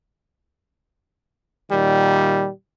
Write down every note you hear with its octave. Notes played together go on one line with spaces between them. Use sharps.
A#2 D#3 G3